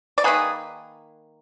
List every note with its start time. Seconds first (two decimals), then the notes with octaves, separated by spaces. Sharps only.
0.18 D5
0.24 D#3 F#3 A#3 G#4 B4